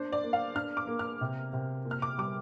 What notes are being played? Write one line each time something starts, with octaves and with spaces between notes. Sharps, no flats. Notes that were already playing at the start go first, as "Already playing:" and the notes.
Already playing: A#3 D4 C5
D5
A#3
F5
D4 F6
D6
A#3
F6
C3
C3
A#2
F6
D6
G3 D6